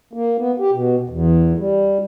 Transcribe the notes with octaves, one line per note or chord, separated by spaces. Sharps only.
A#3
B3
G4
B2
E2
G3